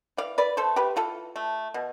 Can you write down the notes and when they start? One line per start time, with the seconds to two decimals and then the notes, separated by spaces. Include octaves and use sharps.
0.17 E3 D5 F5
0.38 B4 D5
0.57 A3 A4 C5
0.76 G4 B4
0.96 E3 F4 A4
1.36 A3
1.74 B2